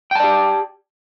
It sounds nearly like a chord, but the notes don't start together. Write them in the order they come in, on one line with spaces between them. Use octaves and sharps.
G5 A5 D5 G4